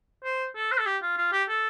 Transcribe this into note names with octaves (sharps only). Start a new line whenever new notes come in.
C5
A4
C5
A4
G4
F4
F4
G4
A4